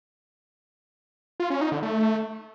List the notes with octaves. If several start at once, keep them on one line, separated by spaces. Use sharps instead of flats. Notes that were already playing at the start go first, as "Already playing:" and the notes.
F4
C#4
D#4
D3
A3